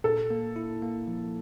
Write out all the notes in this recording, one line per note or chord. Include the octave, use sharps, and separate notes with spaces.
A#2 A4
A#3
E4
A#3
F3